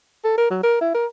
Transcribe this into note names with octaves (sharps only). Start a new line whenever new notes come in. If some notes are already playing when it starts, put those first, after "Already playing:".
A4
A#4
F#3
A#4
E4
A#4